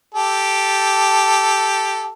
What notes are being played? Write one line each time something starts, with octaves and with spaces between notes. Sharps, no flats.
G4 A4